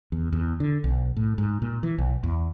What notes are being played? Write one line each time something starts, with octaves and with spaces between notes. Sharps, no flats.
E2
E2
D3
B1
A2
G#2
A#2
E3
B1
E2